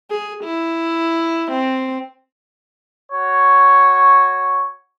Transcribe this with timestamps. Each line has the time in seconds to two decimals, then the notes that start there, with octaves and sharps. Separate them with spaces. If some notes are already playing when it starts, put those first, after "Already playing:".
0.10 G#4
0.44 E4
1.51 C4
3.12 F#4 C#5